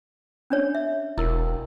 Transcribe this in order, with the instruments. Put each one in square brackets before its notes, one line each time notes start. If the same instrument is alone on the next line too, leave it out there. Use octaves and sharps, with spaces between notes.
[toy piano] C#4 D4 C#5
E5
[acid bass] E1 [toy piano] E4 A#4